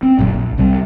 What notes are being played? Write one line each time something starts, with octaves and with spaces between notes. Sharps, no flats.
C4
D1 F#2 A#2
A#1
C2 C3 G3